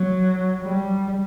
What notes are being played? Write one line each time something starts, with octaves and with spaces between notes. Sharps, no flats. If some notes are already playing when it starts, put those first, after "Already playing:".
Already playing: F#3
G3